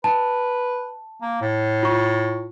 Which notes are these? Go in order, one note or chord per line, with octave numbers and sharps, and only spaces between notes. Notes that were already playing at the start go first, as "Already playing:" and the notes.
B4 A5
A#3
A2
F4 C#6